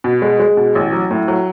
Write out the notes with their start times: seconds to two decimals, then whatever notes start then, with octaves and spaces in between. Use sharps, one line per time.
0.04 B2
0.22 G#3
0.40 G#3
0.57 B2
0.75 A1
0.93 F#3
1.11 A2
1.28 F#3